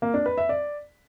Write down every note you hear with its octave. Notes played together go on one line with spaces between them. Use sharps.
A#3
D4
B4
E5
D5